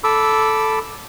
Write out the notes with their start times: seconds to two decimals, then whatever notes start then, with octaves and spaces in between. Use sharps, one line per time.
0.04 A4 B5 D6 E6